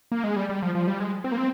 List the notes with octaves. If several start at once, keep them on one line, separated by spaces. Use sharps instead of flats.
A#3
G#3
G3
G3
F3
F3
G3
G#3
C4
A#3
C4